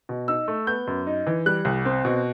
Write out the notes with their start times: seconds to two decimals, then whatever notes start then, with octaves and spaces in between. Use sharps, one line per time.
0.09 B2
0.28 D#4 E6
0.48 A3
0.67 B3 G6
0.87 F#2
1.07 D#4
1.27 E3
1.46 G3 F#6
1.65 C2
1.85 C4
2.05 B2